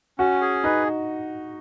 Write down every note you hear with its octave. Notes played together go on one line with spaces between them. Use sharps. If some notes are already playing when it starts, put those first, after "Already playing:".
C#4 F#4
G#4
D#4 B4